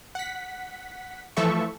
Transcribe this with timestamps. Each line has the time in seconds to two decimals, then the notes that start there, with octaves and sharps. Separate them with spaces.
0.15 F#5 B6
1.37 E3 F3 A3 A4 E5 C#6